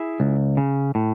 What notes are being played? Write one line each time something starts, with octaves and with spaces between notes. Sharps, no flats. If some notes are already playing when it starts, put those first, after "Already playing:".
Already playing: E4 G#4
C#2
C#3
A2